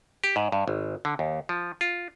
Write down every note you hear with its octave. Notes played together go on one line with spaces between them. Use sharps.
G4
G#2
G2
G#1
D3
D#2
F3
F4